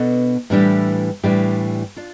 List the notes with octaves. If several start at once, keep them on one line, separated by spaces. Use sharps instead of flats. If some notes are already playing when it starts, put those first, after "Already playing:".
Already playing: B2 B3 D4 A4
A2 E3 G3 D4 G4
A2 E3 G3 D4 G4
D4 F4